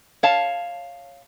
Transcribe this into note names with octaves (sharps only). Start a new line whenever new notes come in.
C#5 F5 A5